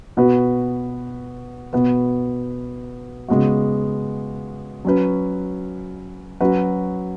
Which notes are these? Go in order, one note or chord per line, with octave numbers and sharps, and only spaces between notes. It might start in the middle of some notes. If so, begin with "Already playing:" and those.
B2 B3 F#4 B4
B2 B3 F#4 B4
C#3 G#3 B3 F#4
F#3 C#4 B4
F#3 C#4 F#4 B4